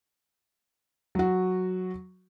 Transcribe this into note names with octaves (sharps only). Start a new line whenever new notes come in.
F#3 F#4